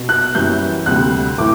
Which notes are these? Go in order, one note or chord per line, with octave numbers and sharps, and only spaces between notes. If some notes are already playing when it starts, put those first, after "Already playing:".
Already playing: B2
F#6
F#2 E3 G3 G6
D2 C3 G3 F#6
A2 E3 D6